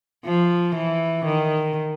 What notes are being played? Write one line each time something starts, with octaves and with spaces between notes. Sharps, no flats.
F3
E3
D#3